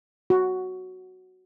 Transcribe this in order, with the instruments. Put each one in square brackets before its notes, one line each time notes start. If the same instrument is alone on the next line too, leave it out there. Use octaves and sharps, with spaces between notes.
[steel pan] F#4